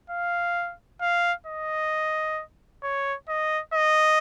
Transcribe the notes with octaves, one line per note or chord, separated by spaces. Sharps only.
F5
F5
D#5
C#5
D#5
D#5